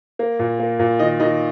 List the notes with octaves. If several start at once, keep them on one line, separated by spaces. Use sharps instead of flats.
A#3
A#2
A#3
A#2
D#3 D#5
D#3 D#5